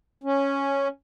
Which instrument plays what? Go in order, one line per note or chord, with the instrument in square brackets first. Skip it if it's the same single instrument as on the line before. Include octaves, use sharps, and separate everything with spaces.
[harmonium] C#4